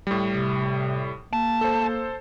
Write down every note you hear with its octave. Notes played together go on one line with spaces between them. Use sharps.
A2 G3
C3
A#3 A5
A4 C5